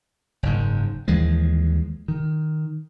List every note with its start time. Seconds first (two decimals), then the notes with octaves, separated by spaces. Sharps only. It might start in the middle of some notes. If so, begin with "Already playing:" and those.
0.43 F#1 G#2
1.08 D#2 E3 F3 G#3
2.08 D#3